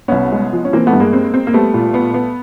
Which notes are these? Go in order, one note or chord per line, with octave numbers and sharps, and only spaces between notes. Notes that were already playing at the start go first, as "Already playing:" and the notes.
C2 B3 C#4
G#3
F3
C#4
E3 A#3 C4
A3 B3
G2
G#3 A#3
C4
C4
A#3
G3 A3 B3
A#2
B3
B3